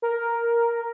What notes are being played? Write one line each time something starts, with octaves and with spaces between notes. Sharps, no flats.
A#4